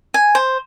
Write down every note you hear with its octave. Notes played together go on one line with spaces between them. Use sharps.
G#5
C5